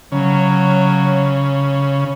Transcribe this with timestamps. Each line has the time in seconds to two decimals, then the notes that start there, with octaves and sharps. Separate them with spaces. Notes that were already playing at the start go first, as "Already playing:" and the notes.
0.12 C#3 F#3